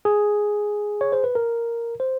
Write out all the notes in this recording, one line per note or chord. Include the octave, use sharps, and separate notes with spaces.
G#4
C#5
C5
B4
A#4
C5